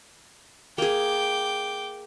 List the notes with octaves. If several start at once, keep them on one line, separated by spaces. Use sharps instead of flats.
A#3 G#4 G5 D6